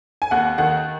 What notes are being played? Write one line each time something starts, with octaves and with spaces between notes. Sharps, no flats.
G#5
D#2 F#5
D#3 F#5